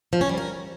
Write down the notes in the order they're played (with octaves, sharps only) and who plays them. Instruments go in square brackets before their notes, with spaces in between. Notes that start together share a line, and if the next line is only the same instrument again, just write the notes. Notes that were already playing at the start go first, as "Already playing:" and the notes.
[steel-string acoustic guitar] F3
C#4
G3
A#4